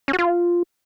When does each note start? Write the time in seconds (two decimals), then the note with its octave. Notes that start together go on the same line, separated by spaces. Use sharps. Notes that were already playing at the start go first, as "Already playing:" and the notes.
0.08 C#4
0.13 F#4
0.19 F4